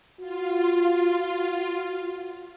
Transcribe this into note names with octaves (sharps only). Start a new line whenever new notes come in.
F4 F#4